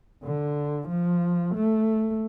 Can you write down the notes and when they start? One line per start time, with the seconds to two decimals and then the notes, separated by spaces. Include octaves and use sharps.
0.23 D3
0.89 F3
1.55 A3